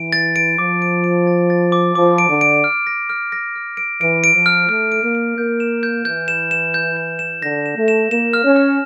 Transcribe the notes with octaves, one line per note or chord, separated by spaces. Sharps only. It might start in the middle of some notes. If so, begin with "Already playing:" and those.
Already playing: E3 D7
A6
D7
F3 D6
D7
D7
A6
A6
D6
F3 D6
D7
D3
D7
F6
A#6
F6
A#6
F6
D7
E3 D7
D7
F3
F6
A3 F6
D7
A#3
D7
A#3 G6
E7
G6
E3 G6
E7
E7
G6
G6
E7
D3 A#6
E7
A3
E7
A#3 E7
F6
C#4
F6